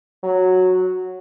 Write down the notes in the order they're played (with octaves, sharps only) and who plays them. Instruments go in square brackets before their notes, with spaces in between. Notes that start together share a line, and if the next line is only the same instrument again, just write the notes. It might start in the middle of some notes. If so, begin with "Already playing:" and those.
[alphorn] F#3